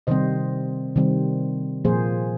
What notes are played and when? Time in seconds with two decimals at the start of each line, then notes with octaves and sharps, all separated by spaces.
0.07 C3 D#3 G3 C4 C5 D#5
0.96 C3 D#3 G3 C4
1.85 A#2 F3 A#3 G#4 C5